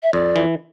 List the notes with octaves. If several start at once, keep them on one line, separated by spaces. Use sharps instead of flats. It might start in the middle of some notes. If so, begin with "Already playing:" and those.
E5
F2 D5
E3